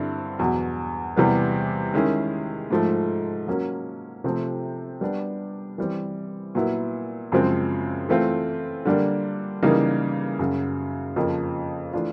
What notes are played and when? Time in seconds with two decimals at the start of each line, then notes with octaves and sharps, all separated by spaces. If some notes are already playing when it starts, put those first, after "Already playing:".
Already playing: G2 D3 G3 C4 E4
0.39 E2 B2 F#3
1.16 E2 C3 E3 G3 B3
1.94 D#3 G#3 C#4 E4 G#4
2.70 G#2 F3 A3
3.48 F#3 A#3 C#4
4.24 C3 F3 A3 C4
5.01 G3 B3 D4
5.78 E3 G3 C4
6.55 A#2 F#3 B3 E4
7.32 F#2 C#3 F3 G#3 C4
8.09 E3 A3 C4 F4
8.85 D3 G3 A#3 D4
9.63 C#3 E3 G3 A#3 D#4
10.39 F#2 C#3 F#3
11.16 F2 C#3 F3 A#3
11.93 E3 A3 D4 F4